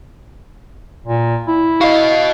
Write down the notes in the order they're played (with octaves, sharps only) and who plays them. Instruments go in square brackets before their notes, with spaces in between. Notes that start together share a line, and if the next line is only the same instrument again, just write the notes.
[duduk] A#2
E4
[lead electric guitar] F#4 D#5 [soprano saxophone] F5